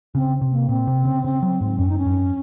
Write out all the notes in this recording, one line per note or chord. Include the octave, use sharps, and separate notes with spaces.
C#3 C4
C3
A#3
A#2 C4
C3
C#3
C#3
F#3
G#2
F#2 C#4
D#4
C#4
F#2